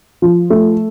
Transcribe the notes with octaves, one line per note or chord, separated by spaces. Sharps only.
F3
A3